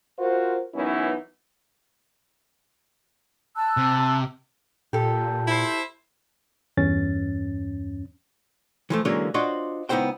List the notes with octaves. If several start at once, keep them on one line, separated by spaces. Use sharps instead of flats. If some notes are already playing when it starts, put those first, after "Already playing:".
F4 F#4 A#4 C5
F#2 E3 B3 C#4 D#4 E4
A5 E6 F#6
C3
A#2 G4 A4
E4 C5
E2 G2 C#4 A6
E3 F3 A3
D3 E3 F#3 G#3 A#3 C#4
D4 F4 F#4 C5 C#5 D#5
C#2 B3 D#4 E4 C5 G5